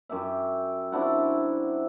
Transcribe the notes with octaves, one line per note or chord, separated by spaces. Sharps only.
F#2 G4 E5
C4 D4 E4 F#4